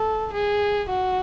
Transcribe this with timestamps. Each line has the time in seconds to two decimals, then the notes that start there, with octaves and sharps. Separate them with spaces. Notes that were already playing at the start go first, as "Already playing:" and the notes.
Already playing: A4
0.33 G#4
0.89 F#4